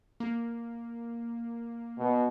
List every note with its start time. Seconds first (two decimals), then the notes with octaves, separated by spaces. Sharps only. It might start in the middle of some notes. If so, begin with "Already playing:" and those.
0.20 A#3
1.98 B2